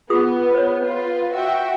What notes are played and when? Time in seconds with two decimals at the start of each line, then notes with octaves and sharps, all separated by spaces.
0.10 B3 F4 G#4 D#6
0.54 C5 C#5
0.86 F4 B4
1.33 F#4 E5 G5